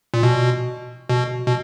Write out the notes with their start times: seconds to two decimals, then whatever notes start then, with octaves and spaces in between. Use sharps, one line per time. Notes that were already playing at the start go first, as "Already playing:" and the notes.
0.14 A#2
0.23 B2
1.09 B2
1.46 B2